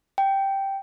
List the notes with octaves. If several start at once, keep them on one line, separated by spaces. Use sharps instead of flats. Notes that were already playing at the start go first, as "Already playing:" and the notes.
G5